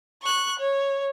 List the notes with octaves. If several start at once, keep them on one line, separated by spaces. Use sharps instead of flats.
C#6 F#6
C#5